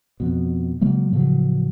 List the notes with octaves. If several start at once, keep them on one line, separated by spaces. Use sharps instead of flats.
F2 B2
C#3 F#3 G#3 A#3
A2 C#3 F3 F#3